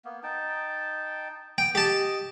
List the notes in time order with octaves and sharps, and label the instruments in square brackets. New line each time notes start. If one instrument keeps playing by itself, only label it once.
[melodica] A#3 B3
D#4 G5 A5
[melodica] B3 [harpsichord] G5
[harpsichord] G4 A5 [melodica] D#5